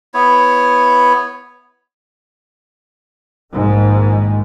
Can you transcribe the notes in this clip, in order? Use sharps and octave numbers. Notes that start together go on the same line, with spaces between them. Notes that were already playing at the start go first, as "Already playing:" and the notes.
B3 E4 C#5
A#1 G#2 D#3